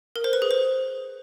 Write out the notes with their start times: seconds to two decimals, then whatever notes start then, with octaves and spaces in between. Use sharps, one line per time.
0.16 A#4
0.24 C5
0.33 B4
0.42 G#4
0.51 C5